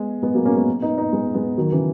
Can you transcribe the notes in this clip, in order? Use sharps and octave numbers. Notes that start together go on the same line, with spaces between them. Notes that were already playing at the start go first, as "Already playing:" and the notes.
Already playing: G#3 B3
G#3 B3
F#3 A#3
A#3 C#4
G#3 B3
B3 D#4
B3 D#4
G#3 B3
G#3 B3
D#3 F#3
C#3 E3